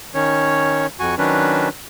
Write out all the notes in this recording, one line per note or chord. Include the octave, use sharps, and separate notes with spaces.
D#3 C#4 C#5
F2 F#4 G#5 C#6
D#3 F#3 C#4 D4 B4